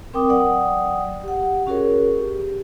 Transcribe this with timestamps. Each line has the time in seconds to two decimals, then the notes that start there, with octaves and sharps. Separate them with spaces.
0.14 C4 A#4 G5 D6 D#6
0.29 F#3 D5 F#5 G5 D#6
1.24 G4 F#5
1.67 C#4 F#4 G#4 A#4 C#5
2.19 G4